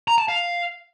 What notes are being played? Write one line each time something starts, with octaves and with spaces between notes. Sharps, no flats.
A#5
A5
F5